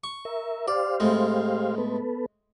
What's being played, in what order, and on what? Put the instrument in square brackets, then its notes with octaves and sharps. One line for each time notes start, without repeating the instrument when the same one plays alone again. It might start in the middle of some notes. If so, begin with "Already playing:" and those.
[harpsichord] C#6
[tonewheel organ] A#4 E5
[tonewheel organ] G4 C5 F5 [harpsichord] D5
[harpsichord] A2 G#3 C4
[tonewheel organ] B3 A4 B4